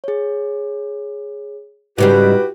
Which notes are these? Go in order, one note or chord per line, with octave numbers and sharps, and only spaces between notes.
G#4 C#5
G#2 C#3 G3 E4 F#4 G4 B4